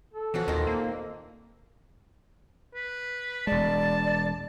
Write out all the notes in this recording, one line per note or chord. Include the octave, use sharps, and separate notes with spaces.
A4
E3 F3 C#4 F#4
D#2 A#2 D#3 C4
A#3
B4
E1 G#3 D5 A5